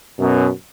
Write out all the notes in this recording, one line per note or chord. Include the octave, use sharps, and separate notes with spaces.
F#2 B2